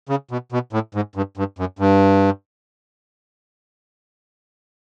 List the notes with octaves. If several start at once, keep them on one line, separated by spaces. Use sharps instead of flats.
C#3
B2
B2
A2
G#2
G2
G2
F#2
G2